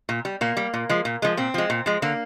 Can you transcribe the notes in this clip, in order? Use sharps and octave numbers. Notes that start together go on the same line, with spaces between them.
A#2
G3
A#2 A#3
G3
A#2
F3 G#3
A#2
F3 G#3
A#2 C4
F3 G#3
A#2
F3 G#3
D3 A#3